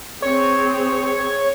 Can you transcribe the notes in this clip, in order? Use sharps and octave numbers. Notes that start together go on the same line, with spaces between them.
C4 G#4 C#5